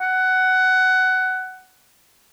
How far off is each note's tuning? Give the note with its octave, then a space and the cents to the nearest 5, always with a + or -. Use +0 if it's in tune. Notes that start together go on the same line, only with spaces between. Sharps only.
F#5 +15